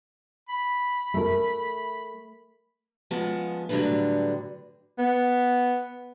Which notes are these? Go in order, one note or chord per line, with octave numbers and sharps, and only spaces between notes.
B5
A3 A#4
F3 G#3 B3 C#4 A5
A2 D3 F#3 G3 D4 B4
B3